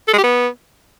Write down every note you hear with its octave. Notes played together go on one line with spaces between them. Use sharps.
A4
G#3
G4
B3